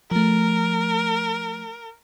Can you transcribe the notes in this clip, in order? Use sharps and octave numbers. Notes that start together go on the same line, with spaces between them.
F3 A3 A#4